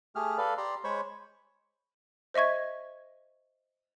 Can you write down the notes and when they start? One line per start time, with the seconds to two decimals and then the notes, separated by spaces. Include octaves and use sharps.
0.16 A3 G4 G#4 F6
0.38 A4 B4 D5 F5
0.58 G4 D5 A#5 C6
0.84 G#3 C5 C#5 B5 C#6
2.34 C5 D#5 E5 C#6 G#6